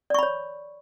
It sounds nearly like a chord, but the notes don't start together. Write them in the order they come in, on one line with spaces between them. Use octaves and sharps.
D5 C#6 B5 C#5